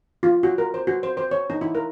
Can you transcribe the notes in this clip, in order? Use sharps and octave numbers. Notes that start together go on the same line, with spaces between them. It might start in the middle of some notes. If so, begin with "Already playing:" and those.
F4
F#4
A#4
C5
F#4
C5
C5
C#5
D#4
E4
A#4